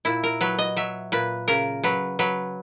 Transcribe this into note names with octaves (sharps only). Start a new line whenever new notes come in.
A#2 E4
A#4
F#3 B4
D#5
F#3 E5
A#2 B4
C#3 A#4
F#3 B4
F#3 B4